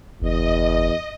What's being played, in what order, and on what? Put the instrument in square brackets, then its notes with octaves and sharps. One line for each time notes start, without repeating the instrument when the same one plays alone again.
[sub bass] F#1 [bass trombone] E2 [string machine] D#5